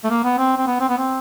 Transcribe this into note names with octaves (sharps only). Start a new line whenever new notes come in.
A3
A#3
B3
C4
C4
B3
C4
B3
C4